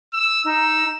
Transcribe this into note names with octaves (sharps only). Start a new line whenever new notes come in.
E6
D#4 E6